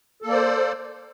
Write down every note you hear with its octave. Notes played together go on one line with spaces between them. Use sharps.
A#3 A4 C5 D5